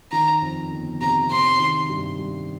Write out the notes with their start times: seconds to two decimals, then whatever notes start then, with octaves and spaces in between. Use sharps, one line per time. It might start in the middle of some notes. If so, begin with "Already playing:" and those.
0.12 D#3 A#5
0.42 F2
0.72 G1
1.01 C3 A#5
1.30 C4 C6
1.59 D#3
1.89 G2
2.19 G3